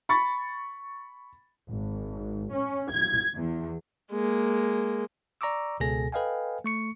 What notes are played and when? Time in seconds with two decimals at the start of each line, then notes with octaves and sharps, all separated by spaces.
0.09 B5 C#6 A6
1.71 G#1
2.53 C#4
2.91 G#6
3.36 E2
4.12 G#3 A#3
5.41 D5 A#5 C#6 D6 E6
5.80 C#2 B2 G#4 A4 G#5 A#6
6.12 A4 B4 D#5 F5 G5 G#5
6.64 A3 C#6 C#7